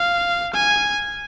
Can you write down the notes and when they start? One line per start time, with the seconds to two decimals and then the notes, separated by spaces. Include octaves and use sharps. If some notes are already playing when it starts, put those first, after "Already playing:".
Already playing: F5
0.54 G#5